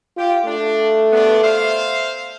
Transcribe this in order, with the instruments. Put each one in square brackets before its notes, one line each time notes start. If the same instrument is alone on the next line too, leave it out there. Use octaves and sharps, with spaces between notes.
[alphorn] F4 [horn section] G4
[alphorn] A3 [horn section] D4
[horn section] G2 B3 D4
C5 E5 F5